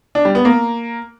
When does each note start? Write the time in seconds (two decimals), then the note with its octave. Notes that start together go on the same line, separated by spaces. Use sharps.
0.15 D4
0.25 G3
0.35 B3
0.45 A#3